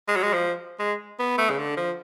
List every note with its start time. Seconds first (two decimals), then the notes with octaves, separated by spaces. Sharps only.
0.08 G#3
0.16 F#3
0.23 G#3
0.33 F3
0.79 G#3
1.19 B3
1.38 A3
1.50 C#3
1.58 D3
1.77 F3